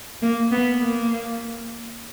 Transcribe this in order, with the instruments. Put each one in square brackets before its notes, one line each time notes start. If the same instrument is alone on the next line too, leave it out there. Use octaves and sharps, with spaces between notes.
[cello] A#3
B3
A#3